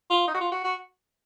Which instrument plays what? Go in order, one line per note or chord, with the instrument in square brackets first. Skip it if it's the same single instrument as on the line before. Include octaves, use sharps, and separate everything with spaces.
[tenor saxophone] F4
D#4
F#4
F4
F#4
F#4